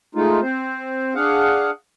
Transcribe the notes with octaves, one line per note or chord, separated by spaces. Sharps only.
G#3 A3 D#4 F4
C4 C5
D4 G#4 F5 F#5